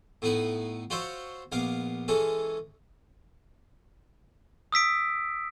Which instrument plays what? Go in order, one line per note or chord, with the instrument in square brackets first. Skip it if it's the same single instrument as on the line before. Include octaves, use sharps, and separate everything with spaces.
[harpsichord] A2 B3 D#4 B4
F4 F#4 C5 C#5 E5
A#1 B3 F5 D6
E3 G#3 C#4 A4
[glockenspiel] D#6 E6 B6 D7